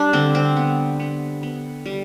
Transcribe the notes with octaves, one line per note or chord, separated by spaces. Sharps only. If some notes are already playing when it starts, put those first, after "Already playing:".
Already playing: G3 D4
D3 C4
C4
B3
B3
B3
G3